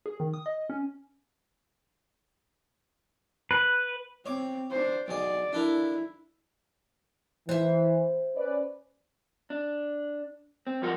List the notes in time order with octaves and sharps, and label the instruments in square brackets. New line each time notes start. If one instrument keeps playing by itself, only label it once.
[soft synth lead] G#4
D#3
D#6
D#5
C#4
[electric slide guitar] B4
[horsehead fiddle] C4 [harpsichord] C#5 D6
[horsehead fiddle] D4 C5
[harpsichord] B1 G#4 [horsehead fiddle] D5
[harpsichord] D4 A4 A#4 [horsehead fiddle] E4
[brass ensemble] E3 [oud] C5 E5
[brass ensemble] C#4 B4 D5
[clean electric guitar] D4
C4
F#2 F3 G3 F4 A#4 F#5